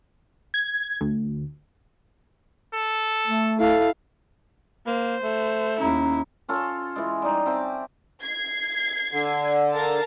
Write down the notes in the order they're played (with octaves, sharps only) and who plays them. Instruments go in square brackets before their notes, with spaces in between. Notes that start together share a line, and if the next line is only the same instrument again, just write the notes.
[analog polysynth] G#6
D2
[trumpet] A4
[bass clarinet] A3
[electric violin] E4 F5 [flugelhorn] A4
[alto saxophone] A#3 [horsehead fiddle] C5
[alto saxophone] A3
[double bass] D#2 [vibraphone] C#4 A#5 [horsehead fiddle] E4
[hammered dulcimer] C#4 F4 A4
E3 G#3
G3 D#4
C4 E5 G5 A5
[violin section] G#6 C7
[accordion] D3
[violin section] A#4 F5 A5